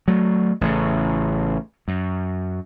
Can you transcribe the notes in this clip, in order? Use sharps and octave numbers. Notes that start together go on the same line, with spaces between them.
F#3 A3
A1 A2 C#3
F#2